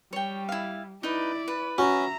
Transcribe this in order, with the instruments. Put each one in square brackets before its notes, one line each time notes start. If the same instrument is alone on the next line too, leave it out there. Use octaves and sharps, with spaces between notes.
[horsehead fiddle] G3 [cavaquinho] C#5 G5
[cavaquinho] E4 F5
[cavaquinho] D#4 B4 [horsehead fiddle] E4 D5
[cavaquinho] B4
[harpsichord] C#4 [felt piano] F#4 [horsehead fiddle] E5 A#5